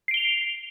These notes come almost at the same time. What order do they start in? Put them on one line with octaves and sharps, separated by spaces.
C7 D7 G7 F7